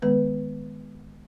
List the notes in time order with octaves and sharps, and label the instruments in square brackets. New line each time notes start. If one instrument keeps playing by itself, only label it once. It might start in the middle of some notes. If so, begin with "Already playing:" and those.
[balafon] D#3 G#3 B3 B4